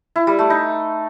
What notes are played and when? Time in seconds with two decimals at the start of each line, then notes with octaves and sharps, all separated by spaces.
0.16 E4
0.27 G3
0.39 A3
0.50 D#4